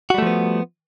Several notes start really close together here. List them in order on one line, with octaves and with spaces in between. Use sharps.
F#4 G3 A3 F3 B3